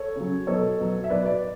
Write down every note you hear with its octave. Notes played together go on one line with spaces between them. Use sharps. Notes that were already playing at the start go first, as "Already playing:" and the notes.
Already playing: A4 C#5
C#3 F#3
B2 F#3 A4 C#5
B2 F#3
E5
B2 F#3 B4 D5
B4 D5